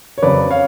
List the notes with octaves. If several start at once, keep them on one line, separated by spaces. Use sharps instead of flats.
C#5
F2 C#3 F#3 B4 D5
C#5 F5